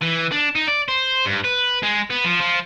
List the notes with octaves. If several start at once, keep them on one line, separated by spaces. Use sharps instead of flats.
E3
D4
D#4
D5
C5
G2
B4
G#3
B3
F3
F3